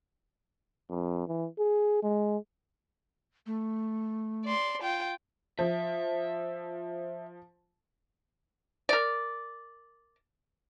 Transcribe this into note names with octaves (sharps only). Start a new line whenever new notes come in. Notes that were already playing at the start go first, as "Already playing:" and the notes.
F2
E3
G#4
G#3
A3
D5 C6
F4 G5
F3 E5
A#4 D5